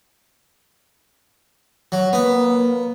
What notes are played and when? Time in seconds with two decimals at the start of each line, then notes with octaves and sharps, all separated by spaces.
1.92 F#3
2.13 A#3 B3